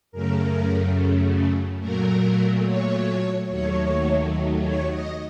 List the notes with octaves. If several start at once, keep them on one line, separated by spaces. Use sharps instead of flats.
F#2 C#3 A3 A#4
A#2 F#3 A3 A#4
C#5
D#2 D#3 F#3 A3 C#5
C#5
D#5